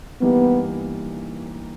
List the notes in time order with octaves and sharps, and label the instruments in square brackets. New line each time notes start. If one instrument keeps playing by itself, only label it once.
[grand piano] G2 E3 A#3 D#4 G4 [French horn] B3